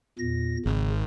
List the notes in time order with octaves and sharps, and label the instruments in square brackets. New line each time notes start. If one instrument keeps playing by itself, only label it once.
[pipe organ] E2 A#2 A#6
[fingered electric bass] G#1 [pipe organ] C#3